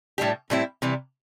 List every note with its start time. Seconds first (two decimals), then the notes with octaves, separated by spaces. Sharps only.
0.18 A2 G3 D4 G4
0.50 A2 G3 C4 E4
0.82 C3 E3 G3